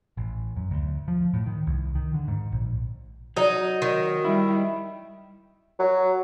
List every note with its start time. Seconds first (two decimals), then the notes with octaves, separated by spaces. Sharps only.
0.17 A1
0.56 F#2
0.71 D2
1.08 F3
1.33 A2
1.46 D#3
1.67 C2
1.95 D#3
2.14 D3
2.28 G#2
2.52 A#1
3.37 F#3 D#4
3.82 D#3
4.25 G3 E4
5.79 F#3